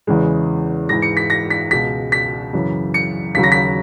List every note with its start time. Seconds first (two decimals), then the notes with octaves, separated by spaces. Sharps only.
0.07 E2 C#3 E3 G#3
0.89 G#2 E3 G#3 A#6
1.02 C#7
1.17 B6
1.30 A#6
1.50 B6
1.71 C#2 B2 G#3 B6
2.12 B6
2.53 F#2 C#3 E3
2.94 C#7
3.35 D#2 C#3 F#3 B6
3.43 A#6
3.52 B6